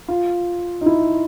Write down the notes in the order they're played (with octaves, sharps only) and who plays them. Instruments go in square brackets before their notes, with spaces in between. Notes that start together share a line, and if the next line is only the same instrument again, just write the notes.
[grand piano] F4
D#4
E4